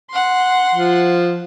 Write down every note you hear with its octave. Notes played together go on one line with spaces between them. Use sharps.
F#5 C6
F3